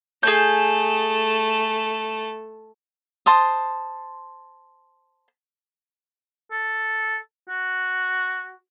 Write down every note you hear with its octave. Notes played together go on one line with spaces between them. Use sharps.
A3 G#4 A4 G6
C5 A5 C6 D#6
A4
F#4